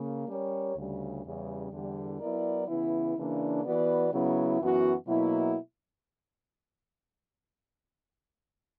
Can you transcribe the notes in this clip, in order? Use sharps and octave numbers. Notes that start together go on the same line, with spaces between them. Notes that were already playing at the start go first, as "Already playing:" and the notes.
Already playing: C#3 A#3
G3 C#4 G4 A#4 C#5
D2 C#3 G3
E2 C#3 G3
E2 D3 G3
F#3 B3 E4 A#4 D5
C#3 E3 B3 E4
C#3 E3 A#3 D4
E3 B3 F#4 B4 D5
C#3 F#3 B3 E4
F#2 E3 B3 F#4
B2 F#3 A#3 E4